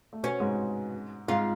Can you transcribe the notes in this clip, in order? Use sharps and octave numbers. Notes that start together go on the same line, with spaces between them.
A3
B2 B3 C#4
G#2 G#3
G#2 G#3 F4